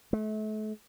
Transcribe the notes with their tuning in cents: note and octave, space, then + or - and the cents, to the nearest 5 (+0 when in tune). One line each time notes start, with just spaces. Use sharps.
A3 -35